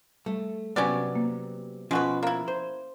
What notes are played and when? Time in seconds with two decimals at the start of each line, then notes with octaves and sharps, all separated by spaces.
0.26 G3 A3
0.76 C3 F#3 B3 C#4 G4 D5
1.15 A#3
1.91 B2 F3 G#3 C#4 F#4 B4
2.23 A#3 E4
2.48 C5